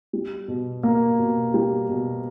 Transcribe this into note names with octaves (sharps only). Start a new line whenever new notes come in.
G3
B2
A#3
B2
G3
B2